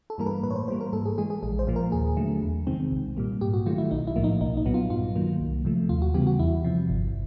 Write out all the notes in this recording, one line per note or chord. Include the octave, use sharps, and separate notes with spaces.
A4
G2 E3 G3 A#3 A#4
B4
A2 B4
C#5
C5
E3 G3 A#3 C5
A#4
G#2 A4
G#4
E3 G#3 G#4
G#4
A#1 G#4
C5
A#2 F3 A#3
A#4
D#2 G#4
D3 F#3 A3
E2
C3 D#3 G#3 C4
B1
A#2 G3 A#3
G#2 G4
F#4
D#3 F#3 A3 F4
E4
B1 D#4
E4
A2 F3 A#3
D#4
B1 D#4
D#4
A#2 F#3 B3
F4
G2 F4
D#3 F#3 A#3
C2
C3 F3 A3
D#2 F4
F#4
C#3 E3 G3 B3 G4
F#4
E2 E4
C3 F3
G1